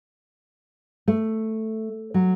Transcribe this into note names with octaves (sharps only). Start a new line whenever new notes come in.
A3
F#3